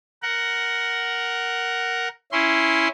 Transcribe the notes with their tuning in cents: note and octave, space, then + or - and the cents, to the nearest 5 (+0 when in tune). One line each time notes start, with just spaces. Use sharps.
A#4 +0 F#5 +10
C#4 +0 E4 +0 C6 +0